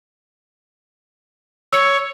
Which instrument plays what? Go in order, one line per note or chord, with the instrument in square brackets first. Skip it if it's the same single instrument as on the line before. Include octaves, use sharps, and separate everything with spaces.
[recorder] C#5 [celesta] E6 C#7